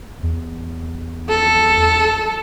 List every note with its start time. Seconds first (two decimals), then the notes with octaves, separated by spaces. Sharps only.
0.23 E2
1.29 A4